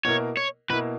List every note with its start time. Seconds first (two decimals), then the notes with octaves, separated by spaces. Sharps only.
0.05 B2 A#3 E4 A#4 C#5
0.37 C#5
0.70 B2 A#3 E4 A#4 B4